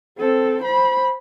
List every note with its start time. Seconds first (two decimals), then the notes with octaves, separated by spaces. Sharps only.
0.18 C4 A4
0.62 C5 B5